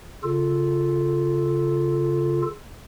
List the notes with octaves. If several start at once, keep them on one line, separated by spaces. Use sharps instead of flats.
C#3 F4 A4